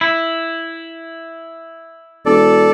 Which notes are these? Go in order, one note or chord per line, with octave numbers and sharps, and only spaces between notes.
E4
E1 A4 D5